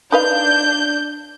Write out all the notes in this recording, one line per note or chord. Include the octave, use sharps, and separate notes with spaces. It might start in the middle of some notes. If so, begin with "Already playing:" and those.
D4 D#4 B4 F5 G6